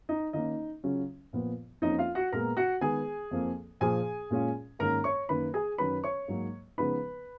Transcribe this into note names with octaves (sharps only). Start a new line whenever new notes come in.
D#4 D#5
D#3 A#3 C#4 D#4 D#5
C#3 F#3 C#4 F4
A#2 F3 B3 F4
F2 F3 A#3 C#4 D#4 F4 D#5
F4 F5
F#4 F#5
A#2 G#3 B3 A#4 A#5
F#4 F#5
D#3 G#3 B3 G#4 G#5
F2 F3 A#3
A#2 F3 A#3 G#4 G#5
A#2 G#3 C#4 F4
G#2 D#3 A#3 C#4 A#4 A#5
C#5 C#6
F#2 D#3 A#3 B4 B5
G#4 G#5
F#2 D#3 F#3 C#4 B4 B5
C#5 C#6
G#2 F#3 A#3
C#3 F3 G#3 B3 D#4 B4 B5